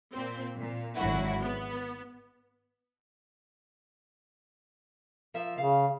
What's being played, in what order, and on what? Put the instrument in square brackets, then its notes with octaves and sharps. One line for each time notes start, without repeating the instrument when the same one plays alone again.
[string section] A#2 C4
A#2
G#1 D3 F#3 E4 F#4
B3
[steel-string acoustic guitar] F3 A#4 E5
[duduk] C#3 [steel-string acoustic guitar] F5